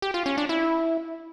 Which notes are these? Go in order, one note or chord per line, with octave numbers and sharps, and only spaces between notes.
G4
F4
C#4
D4
E4